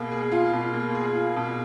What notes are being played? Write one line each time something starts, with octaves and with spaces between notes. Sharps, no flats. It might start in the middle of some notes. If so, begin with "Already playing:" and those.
Already playing: B2 A#3 G#4
G#4
F4
B2
A#3
G#4
F4
B2